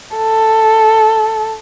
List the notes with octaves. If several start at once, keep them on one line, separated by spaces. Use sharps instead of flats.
A4